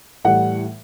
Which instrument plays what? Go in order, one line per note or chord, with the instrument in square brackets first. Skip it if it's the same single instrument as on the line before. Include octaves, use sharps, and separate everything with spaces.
[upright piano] A2 E3 G3 F#5